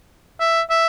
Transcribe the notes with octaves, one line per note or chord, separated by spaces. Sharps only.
E5
E5